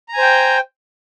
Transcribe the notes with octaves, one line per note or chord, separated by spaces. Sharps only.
C5 G5 G#5 A#5